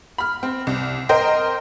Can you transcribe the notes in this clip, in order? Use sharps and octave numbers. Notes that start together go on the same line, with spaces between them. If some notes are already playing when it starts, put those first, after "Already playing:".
B5 F6
C4
C2
A#4 C5 D#5 G5